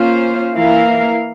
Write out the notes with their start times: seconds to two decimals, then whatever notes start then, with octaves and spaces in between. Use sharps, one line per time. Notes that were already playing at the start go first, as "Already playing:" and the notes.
Already playing: A#3 C#4 F4 C5 F5
0.53 E3 A#3 E4 A#4 F5